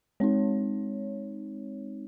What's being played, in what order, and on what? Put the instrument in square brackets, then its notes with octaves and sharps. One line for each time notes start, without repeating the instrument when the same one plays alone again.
[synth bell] G#3 C4 D#4 C#5